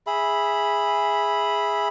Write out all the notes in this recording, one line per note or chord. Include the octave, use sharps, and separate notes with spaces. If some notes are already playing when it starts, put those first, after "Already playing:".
G#4 E5 B5